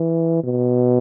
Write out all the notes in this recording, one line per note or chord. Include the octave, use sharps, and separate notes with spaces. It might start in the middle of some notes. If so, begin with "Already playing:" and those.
Already playing: E3
B2